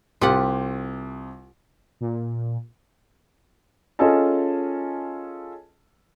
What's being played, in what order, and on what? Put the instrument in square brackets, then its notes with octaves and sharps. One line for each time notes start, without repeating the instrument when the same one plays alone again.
[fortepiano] C2 D6 [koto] F4 G4 F#5
[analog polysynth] A#2
[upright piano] C#4 F4 G#4 A4 D#5 A5